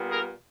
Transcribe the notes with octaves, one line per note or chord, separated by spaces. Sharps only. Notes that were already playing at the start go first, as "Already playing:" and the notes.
Already playing: A#2 G3 B3
G#4 A#4